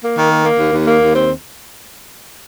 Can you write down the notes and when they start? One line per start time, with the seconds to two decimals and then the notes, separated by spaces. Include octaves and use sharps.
0.02 A#3
0.16 D#3
0.30 A#3
0.44 A#3
0.59 D#2
0.73 D#2
0.87 A#3
1.01 D#2
1.14 C4